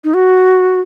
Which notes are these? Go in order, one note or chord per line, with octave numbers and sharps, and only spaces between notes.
D#4
F#4